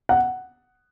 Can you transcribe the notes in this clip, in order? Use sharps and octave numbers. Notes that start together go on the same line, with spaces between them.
F#5